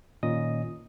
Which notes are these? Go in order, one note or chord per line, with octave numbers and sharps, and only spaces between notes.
A#2 D#3 C#4 D#5 D#6